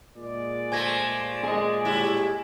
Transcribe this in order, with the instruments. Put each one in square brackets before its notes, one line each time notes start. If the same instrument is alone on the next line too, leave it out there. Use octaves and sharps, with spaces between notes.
[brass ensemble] A#2 G#3 D5
[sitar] F3 A3 [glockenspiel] G#5 G#6 A#6
[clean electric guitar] G#4 D#5
[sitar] A2 G3 E4